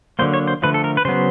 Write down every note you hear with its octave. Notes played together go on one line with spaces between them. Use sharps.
D3 F#3 A#3 C5
C#5
C5
D3 F3 A3 B4
A4
A#4
B4
C#3 F#3 B3 C5